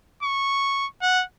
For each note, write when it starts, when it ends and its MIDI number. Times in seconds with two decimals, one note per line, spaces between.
0.23 0.87 85
1.02 1.24 78